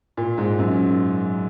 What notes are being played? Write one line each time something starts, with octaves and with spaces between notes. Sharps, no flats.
A#2
G#2
F#2